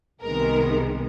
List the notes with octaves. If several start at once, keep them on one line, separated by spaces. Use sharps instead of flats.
C2 C3 D#3 G#3 B3 A#4